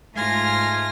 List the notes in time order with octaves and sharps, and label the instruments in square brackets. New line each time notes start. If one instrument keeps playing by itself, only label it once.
[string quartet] G#2 A3 F4 G#5 F6 A#6